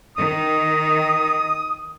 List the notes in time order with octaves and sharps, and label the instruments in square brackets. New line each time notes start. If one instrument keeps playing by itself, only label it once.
[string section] D#3 [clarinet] D#6